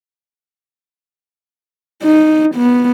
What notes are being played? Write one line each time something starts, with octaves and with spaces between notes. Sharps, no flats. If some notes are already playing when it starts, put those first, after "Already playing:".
D#4
B3